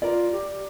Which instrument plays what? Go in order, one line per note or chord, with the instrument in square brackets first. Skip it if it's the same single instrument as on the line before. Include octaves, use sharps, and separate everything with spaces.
[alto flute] F4 [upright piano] A#4 D5
[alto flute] G4